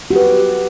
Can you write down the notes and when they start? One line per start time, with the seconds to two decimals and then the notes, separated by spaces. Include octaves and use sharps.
0.11 F#4
0.13 G4
0.16 B4